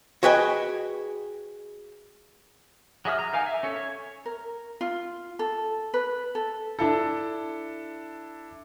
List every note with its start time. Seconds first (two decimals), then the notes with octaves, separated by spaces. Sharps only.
0.23 F#4 G#4 B4 D#5 G5 G#5
3.05 F#3 G#4 E5 D#6 F6
3.19 A#5
3.33 D#4 A#4 F5 G#5
3.46 E5
3.63 C#4 A4
3.76 C#5
4.25 A#4
4.81 F4
5.39 A4
5.94 B4
6.35 A4
6.79 D4 E4 A4